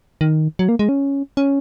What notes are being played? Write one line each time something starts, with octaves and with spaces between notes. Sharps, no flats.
D#3
F#3
A#3
G#3
C#4
C#4